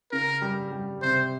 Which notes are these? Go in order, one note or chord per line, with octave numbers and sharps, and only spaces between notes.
C#3 A#4
G3
G3
C3 C5